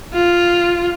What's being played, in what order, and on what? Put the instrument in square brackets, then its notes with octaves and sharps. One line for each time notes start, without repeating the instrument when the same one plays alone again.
[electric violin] F4